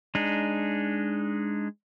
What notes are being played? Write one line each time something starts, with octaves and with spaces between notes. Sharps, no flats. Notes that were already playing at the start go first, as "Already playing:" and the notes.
G#3 D4 D#4